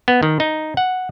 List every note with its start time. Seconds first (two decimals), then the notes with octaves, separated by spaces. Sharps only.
0.08 B3
0.23 D#3
0.40 D#4
0.77 F#5